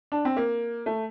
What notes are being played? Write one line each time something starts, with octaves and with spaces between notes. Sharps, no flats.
D4
C4
A#3
A3